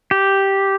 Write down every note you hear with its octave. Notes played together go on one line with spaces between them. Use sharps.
G4